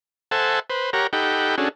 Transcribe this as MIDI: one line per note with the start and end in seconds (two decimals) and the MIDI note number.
0.31 0.59 69
0.31 0.59 72
0.31 0.59 76
0.31 0.59 78
0.31 0.59 80
0.31 0.59 81
0.70 0.90 71
0.70 0.90 72
0.93 1.07 67
0.93 1.07 70
0.93 1.07 73
0.93 1.07 78
0.93 1.07 82
1.13 1.56 63
1.13 1.56 67
1.13 1.56 69
1.13 1.56 78
1.13 1.56 79
1.13 1.56 83
1.58 1.69 61
1.58 1.69 62
1.58 1.69 66
1.58 1.69 68
1.58 1.69 69